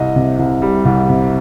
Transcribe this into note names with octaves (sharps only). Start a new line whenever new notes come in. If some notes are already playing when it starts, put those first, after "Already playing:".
Already playing: C2 D#5
C3
C2
G3
C2
C3